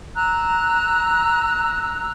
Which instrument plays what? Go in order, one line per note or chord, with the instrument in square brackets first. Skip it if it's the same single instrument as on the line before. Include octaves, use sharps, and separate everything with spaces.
[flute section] A#5 E6 F#6